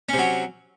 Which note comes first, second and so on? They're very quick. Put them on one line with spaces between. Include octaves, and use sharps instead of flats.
C#4 C3 F#3